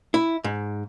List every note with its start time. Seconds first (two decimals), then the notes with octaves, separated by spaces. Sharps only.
0.14 E4
0.44 G#2